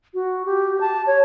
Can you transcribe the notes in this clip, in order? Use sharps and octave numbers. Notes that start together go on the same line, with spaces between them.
F#4
G4
A5
C#5